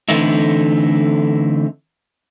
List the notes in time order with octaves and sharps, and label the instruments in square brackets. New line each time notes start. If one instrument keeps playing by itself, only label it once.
[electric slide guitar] D3 E3 A3 C4 D#4 E4